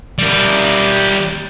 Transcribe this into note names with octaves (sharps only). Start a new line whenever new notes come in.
G3 A#4